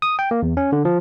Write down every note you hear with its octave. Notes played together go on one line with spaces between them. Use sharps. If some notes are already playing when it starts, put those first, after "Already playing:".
D#6
G5
A#3
E2
C#4
D3
F3